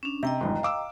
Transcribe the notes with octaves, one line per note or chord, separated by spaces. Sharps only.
C#4 D4
C3 D#5 G5 A#5
G#1 E2 G2
F5 D6 E6